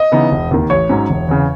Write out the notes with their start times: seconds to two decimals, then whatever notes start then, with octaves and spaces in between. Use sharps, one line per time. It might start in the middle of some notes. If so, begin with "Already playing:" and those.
Already playing: D#5
0.12 C#3 E3 B3 D#4
0.31 E1
0.51 D#2 D#3
0.70 A1 C#5
0.89 G#2 F#3 C#4
1.10 E1
1.28 E2 C#3